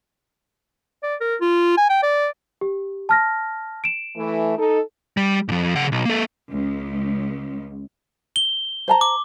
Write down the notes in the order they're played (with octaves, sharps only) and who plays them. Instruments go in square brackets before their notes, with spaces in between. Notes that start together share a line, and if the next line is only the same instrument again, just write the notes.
[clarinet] D5
A#4
F4
G#5
G5
D5
[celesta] G4
A5 F6 A#6
D7 E7
[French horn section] E3 A3
D#4 A4
[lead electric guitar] G3
F2 G#2
C#3 F#5
B1
A#3 A4
[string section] C#2
[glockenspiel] G7
[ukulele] C5 A5 A#5
[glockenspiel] D6